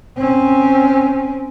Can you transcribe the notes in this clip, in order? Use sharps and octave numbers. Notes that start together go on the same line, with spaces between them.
C4 C#4